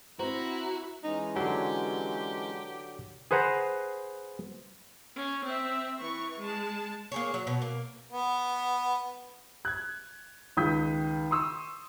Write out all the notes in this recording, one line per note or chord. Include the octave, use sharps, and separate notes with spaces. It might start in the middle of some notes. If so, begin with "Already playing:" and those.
C4 E4 F#4 C5 A#5
E3 G#3 C#4 D#4
D3 F#3 G4
G#4 B4 C5 F#5 A#5
C#4
C4 E5
E3 C#6
G#3 A5
A#3 G#4 C#5
F#3
B2
A#3
B3
F#6 G#6
C#2 D#3 D#6 G6 B6
C6 C#6 D#6 E6